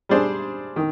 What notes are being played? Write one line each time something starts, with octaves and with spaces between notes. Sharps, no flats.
G3 D4 G#4 C5
D#3